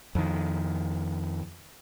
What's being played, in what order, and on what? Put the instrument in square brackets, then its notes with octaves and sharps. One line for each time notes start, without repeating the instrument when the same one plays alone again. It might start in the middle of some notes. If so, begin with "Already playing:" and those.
[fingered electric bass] F2 D#3